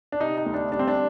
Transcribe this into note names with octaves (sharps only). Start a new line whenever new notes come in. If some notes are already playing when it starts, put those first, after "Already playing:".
D4
C3 D#4
D#4
D2
D4
G3 D4
C4
D4